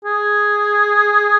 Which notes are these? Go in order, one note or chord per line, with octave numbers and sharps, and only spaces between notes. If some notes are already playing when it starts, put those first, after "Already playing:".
G#4